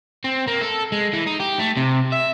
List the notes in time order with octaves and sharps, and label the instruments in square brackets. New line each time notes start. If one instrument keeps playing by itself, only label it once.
[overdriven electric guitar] C4
A#3
A4
G#3
E3
D#4
G4
A3
C3
E5